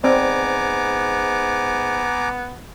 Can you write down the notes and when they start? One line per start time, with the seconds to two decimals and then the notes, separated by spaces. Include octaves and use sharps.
0.04 G#2 B3 C4 D5 G#5 A#5 D6